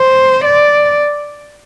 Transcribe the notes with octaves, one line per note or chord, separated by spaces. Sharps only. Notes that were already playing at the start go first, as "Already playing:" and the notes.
Already playing: C5
D5